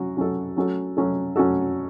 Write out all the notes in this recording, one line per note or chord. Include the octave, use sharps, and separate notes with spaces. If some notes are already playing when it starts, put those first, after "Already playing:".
Already playing: F#3 C#4 F#4
F#3 C#4 F#4 A4
F#3 C#4 F#4 A4
F#3 C#4 F#4 A4
F#3 C#4 F#4 A4